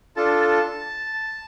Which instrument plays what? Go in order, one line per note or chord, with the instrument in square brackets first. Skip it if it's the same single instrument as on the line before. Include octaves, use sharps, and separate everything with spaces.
[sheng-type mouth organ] D4 F4 A4 A5